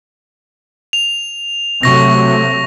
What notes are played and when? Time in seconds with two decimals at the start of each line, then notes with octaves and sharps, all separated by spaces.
0.93 F7
1.83 C3 F#3 A3 C#6 A#6